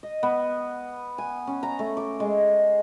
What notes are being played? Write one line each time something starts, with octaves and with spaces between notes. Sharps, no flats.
D#5
B3
G#5
C#4
A#5
A3
D6
G#3